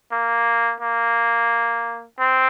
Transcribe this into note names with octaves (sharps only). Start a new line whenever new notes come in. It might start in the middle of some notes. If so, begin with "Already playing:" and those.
A#3
A#3
C4